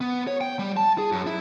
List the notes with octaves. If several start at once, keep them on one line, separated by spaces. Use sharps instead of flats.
B3
C#5
G5
G3
A5
G#4
F#2
E4